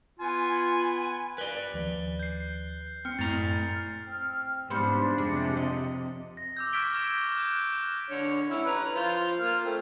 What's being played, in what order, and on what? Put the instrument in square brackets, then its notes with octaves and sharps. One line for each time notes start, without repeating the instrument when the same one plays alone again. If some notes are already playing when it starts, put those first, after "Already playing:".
[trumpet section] B3 G#5 [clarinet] F4
[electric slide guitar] B4 D5 [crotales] F#6 G7
[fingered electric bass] D#2 F3
[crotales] G6 C7
[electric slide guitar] C4 [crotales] F6 C#7
[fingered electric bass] F#2 [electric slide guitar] A2 A#5 [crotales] A6
[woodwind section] C4 F6
[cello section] G#2 C#3 [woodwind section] F3 D4 [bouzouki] G3 B3 C5
[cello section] F2 C3 [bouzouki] G#3
[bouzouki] D#5
[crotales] A#6
D6 E6 G6
C#6 F6 G#6 B6 D7 G7
E6 G6 E7
F#6 E7
F#6 E7
[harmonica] D3 C#5
C#4 E4
B4 A#5
F4 C5
A#3 F4 F6
A3 C4